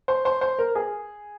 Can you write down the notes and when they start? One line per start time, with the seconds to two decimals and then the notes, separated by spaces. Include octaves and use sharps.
0.08 C5
0.25 C5
0.41 C5
0.59 A#4
0.75 G#4